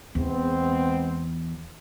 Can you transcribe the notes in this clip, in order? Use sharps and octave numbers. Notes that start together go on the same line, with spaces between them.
E2 G#3 B3 C4